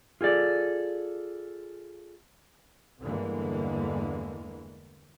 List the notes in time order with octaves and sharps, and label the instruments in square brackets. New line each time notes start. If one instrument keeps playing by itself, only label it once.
[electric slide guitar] F4 G#4 A4 D5
[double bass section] E2 G2 D3 E3 G#3 A#3